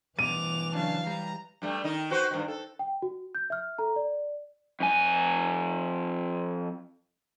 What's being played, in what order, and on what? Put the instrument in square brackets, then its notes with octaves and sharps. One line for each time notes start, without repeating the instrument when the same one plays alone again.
[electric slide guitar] G2 B2 [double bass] E3 [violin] D6 F7 [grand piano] D#7
[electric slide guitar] C#3 F#3 D4 [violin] F5 A5
[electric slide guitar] G3 [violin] A#5
[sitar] G2 G3 A3
D#3 D#4 D#5
F#4 B4 C5
G2 D#3
A4
[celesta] G5
F#4
G6
E5 F6
A4 A#5
D5
[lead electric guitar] F2 G#5